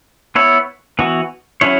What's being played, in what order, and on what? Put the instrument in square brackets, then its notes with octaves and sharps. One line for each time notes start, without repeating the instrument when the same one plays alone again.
[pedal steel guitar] B3 E4 C#5
E3 B3 F#4
F#3 C#4 E4 C#5